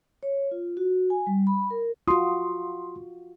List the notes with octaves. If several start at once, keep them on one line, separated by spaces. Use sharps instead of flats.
C#5
F4
F#4
G#5
G3
B5
A#4
F4 F#4 C6 D#6